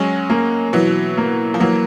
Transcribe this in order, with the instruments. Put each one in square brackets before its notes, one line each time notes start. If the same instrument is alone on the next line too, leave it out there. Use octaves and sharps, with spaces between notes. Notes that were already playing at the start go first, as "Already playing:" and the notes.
Already playing: [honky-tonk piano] F#3 G#3 [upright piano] C#4
[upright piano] A#3
[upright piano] B2 [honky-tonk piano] E3 F#3
[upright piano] A#3
[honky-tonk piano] F3
[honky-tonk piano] E3 F#3 [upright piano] A#3